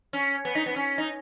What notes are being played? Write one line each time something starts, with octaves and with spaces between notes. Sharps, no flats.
C#4
B3
D#4
B3
C#4
D#4